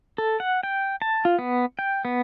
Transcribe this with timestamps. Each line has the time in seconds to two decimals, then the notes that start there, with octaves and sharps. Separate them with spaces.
0.18 A4
0.40 F#5
0.63 G5
1.02 A5
1.25 F4
1.39 B3
1.79 G5
2.05 B3